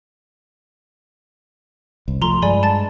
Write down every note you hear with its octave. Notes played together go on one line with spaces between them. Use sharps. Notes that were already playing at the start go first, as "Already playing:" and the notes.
C2
F3 A3 A#5 C6
G2 G#3 D5 G#5 B5
A5 A6